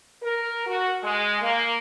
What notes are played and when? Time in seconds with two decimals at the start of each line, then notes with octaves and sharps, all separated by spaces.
0.23 A#4
0.67 F#4
1.04 G#3
1.42 A#3